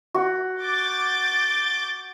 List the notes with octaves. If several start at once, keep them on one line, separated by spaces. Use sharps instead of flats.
F#4
D6 G6 A6